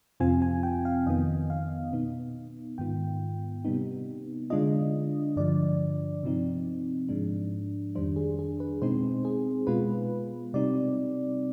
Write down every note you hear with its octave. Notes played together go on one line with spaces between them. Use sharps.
F2 C3 F3 C4 F4 G#5
G#5
G5
F5
F2 D#3 B3 D#5
F5
B2 B3 D#4
G#2 D#3 B3 F4 G5
C3 G3 B3 D#4
D3 G#3 D4 F4 D#5
G2 D3 F3 D5
C3 F3 C4 D#4
G#2 F3 G#3 D4
F2 D#3 G3 D4 C5
G#4
G#4
B4
B2 G#3 C4 D#4 C5
G#4
B2 G#3 B3 F4 B4
C3 G3 C4 D#4 D5